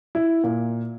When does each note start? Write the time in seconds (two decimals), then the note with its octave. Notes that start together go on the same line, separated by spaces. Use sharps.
0.15 E4
0.44 A#2